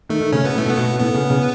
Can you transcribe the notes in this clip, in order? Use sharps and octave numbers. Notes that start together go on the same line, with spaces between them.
D#3 A3
D#3
C#3 C#4
B2 B3
A2
A3
B2
B3
B2
A2 B3
C#3
C#3